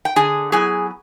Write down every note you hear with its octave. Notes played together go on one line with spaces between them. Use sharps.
G5
D3 G#4 G#5
F#3 B3 E4 G#4 G#5